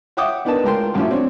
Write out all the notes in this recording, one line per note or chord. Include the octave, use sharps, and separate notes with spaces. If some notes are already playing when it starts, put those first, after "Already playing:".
C#5 E5 F#5 G5 D6 D#6
B3 D4 D#4 A#4 B4 A5
C#2 A2 A#4 G5 C6
A#1 F#2 A2 C#4 E5
C4 D4 C#5